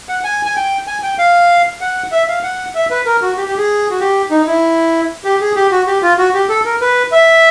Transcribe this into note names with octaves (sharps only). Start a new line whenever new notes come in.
F#5
G#5
G#5
G5
G#5
G5
F5
F#5
E5
F5
F#5
E5
B4
A#4
F#4
G4
G4
G#4
F#4
G4
D#4
E4
G4
G#4
G4
F#4
G4
F4
F#4
G4
A4
A#4
B4
E5